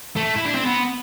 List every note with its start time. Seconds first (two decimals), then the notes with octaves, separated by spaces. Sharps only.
0.17 A3
0.36 E4
0.45 D4
0.56 C4
0.66 B3